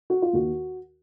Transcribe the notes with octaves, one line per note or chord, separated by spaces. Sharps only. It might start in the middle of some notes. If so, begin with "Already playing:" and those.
F#4
F4
D#2 D#3 F#4